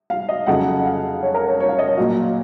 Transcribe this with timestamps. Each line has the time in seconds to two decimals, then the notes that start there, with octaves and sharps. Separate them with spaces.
0.10 F5
0.29 D#5
0.47 F2 C#3 F#3 F#5
0.85 F5
1.23 C#5
1.34 A#4
1.48 C#5
1.60 C#5
1.69 F5
1.79 D#5
1.88 C#5
1.97 A#2 F#3 F5